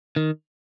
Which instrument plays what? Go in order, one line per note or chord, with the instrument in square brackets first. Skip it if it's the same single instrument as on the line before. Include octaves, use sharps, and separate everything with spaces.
[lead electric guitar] D#3